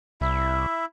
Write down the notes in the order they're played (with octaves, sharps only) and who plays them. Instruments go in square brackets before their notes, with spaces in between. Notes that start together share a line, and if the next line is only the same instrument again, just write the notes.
[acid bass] C2 [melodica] E4 E5